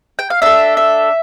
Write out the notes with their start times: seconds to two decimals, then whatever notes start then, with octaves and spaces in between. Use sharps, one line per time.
0.19 G5
0.30 F5
0.42 D4 A4 E5
0.77 E5